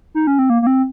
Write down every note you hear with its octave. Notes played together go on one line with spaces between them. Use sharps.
D#4
C#4
C4
A#3
A#3
C4